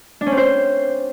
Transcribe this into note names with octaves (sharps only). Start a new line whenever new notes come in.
D4
C#4
C4
C5